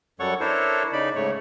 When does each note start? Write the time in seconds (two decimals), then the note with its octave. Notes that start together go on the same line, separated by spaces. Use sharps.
0.20 F#2 G3 A4 C#5 F#5 C#6
0.40 D4 E4 A4 A#4 C5 C#5
0.93 C#3 D#4 D5 B5
1.15 G#2 C#3 A3 C#5